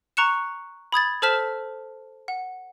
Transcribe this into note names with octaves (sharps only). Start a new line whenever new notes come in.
A#5 C#6 F#6 C#7 E7
B5 D#6 G#6 A6
A4 C5 A5 F6 B6 E7
F#5